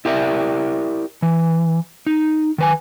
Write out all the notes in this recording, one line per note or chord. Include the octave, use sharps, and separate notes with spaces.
E4 G4 A#4 D5 E5
E3
D#4
D#3 B4 G#5